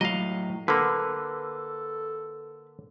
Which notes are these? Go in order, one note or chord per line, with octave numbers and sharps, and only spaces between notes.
A2 F#3 D#5 F5
D3 A#3 A4 B4